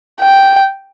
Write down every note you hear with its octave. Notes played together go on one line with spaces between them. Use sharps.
G5